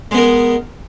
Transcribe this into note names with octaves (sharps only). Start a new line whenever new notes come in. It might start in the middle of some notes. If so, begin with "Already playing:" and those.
G#3 B3 A#4